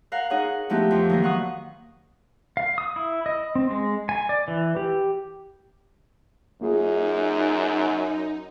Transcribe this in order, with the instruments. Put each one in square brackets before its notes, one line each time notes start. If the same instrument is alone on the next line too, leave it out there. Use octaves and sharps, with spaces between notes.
[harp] A#4 F5 F#5
D#4 G#4 C#5 F#5
F3 A3 B3 D#4 E4 G4
F2 F3
D#3 F#3 A#3
F5 F#5 C#6 D#6
[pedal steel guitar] F5
D#6
E4
D#5
C4
G#3
G#5
D5
E3
G4
[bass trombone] F#2 [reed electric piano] A#3 F4 G#4 [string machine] D#4